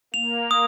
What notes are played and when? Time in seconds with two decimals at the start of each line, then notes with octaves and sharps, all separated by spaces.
0.14 A#3 F7
0.51 D#6